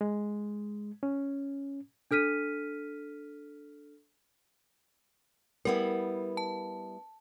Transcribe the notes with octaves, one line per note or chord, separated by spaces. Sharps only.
G#3
C#4
D4 A4 F6 B6 D#7
G3 B3 E4 A#4
A5